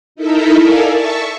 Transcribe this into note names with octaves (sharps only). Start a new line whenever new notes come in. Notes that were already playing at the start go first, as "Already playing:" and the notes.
D#4 E4 A4 A#4 E5
A4 A#4 D5 F5 G#5
E5 A5 C#6